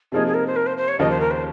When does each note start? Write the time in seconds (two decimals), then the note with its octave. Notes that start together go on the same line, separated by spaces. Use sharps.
0.12 C3 F3 A#3 D#4 G#4
0.27 G#4
0.34 A#4
0.47 C5
0.56 A#4
0.66 C5
0.77 C5
0.88 C#5
0.99 D#2 C#3 F3 A#3 D#5
1.10 C5
1.20 A#4
1.31 C5